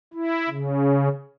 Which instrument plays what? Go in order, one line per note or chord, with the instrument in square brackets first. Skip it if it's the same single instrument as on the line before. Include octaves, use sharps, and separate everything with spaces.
[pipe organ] E4
C#3